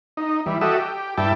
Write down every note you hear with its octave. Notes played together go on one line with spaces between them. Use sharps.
D#4
E3 G3
F#4 G4 A4 D#5 E5
G4
G2 E4 G5 A5